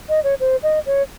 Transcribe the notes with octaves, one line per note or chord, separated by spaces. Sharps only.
D#5
C#5
C5
D#5
C#5